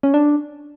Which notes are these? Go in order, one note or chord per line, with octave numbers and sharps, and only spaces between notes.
C#4
D4